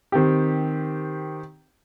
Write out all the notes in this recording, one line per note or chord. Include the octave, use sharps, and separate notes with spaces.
D#3 C4 G4